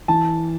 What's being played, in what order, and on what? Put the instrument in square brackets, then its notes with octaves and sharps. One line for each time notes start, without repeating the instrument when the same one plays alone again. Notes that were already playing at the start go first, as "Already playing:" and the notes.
[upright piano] E3 A5